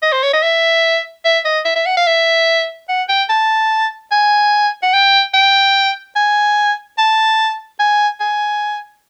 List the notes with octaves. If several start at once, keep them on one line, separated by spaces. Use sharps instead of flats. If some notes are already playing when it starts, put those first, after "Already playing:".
D#5
C5
C#5
D#5
E5
E5
D#5
E5
E5
F#5
F5
E5
F#5
G5
A5
G#5
F#5
G5
G5
G#5
A5
G#5
G#5